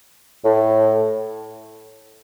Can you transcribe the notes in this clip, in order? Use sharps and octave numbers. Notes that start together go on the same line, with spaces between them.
A2